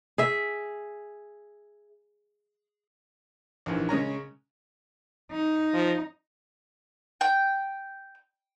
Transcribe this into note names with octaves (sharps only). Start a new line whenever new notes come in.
G#4 E5
A#1 D#2 E3
C#3 G#3 C#4 A#5
D#4
F3
G5